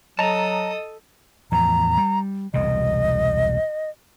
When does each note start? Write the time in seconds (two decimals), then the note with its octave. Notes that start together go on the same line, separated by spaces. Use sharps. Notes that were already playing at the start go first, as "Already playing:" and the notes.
0.19 F#3 A4 D#5 A5 A#5 D#6
1.52 E2 A2 F3 A#5
1.97 G3
2.54 E1 C2 C3 D#5